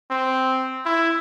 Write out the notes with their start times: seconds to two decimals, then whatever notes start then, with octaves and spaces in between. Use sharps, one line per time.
0.10 C4
0.85 E4